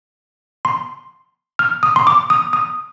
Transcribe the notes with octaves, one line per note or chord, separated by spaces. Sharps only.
C6
F6
D#6
C6
D6
D#6
D#6